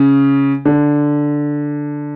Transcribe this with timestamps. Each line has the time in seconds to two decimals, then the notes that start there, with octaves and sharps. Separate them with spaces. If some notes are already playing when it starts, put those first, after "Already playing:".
Already playing: C#3
0.65 D3